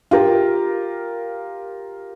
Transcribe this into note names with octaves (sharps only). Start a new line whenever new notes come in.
F4 G4 A#4